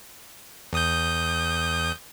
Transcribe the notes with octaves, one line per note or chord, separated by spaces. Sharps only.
E2 D#6 G6